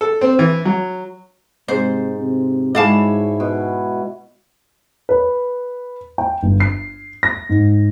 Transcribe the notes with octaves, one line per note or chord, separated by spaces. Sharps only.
A4
C4
E3
F#3
G#2 C3 C5
C3
G#2 G#3 E4 F#4 C#5 D5 F5 A5
B2
B4
G5
G1
C7
A#6
G#2